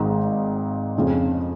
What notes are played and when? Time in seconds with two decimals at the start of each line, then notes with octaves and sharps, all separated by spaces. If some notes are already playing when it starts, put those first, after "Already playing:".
Already playing: G#1 G#2 D#3 G#3 D#4
0.96 F2 C#3 F3 C4 D#4